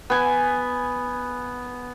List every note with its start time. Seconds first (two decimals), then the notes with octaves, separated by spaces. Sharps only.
0.10 B3 G#5